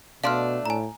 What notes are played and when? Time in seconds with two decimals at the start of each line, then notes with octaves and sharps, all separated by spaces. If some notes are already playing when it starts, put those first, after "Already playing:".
0.24 B2 A3 D4 F5 C6 F6
0.66 A2 G#5 A#5